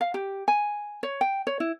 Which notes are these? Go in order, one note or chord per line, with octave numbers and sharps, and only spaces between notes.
F5
G4
G#5
C#5
G5
C#5
E4